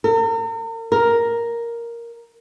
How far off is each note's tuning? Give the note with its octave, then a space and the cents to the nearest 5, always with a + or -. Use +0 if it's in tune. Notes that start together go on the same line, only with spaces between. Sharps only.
A#4 -40
A#4 +5